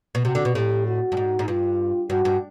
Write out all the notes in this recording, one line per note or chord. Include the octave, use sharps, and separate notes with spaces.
B2
C3 F#4
D3
B2
A2 G4
F#4
G2
G#2
G#2
G2 F4
G2 F#4
G2